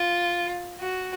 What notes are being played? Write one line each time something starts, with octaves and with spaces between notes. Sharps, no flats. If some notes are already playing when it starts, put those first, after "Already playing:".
Already playing: F4
F#4